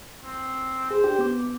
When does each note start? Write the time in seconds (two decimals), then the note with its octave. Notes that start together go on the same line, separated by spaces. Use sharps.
0.24 C4
0.91 G#4 C5
1.04 D4 G4
1.19 B3 D6